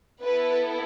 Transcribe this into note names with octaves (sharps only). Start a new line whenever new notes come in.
B3 E4 A4 B4